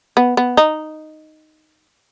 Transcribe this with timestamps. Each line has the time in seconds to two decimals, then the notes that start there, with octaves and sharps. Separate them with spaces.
0.17 B3
0.37 B3
0.57 D#4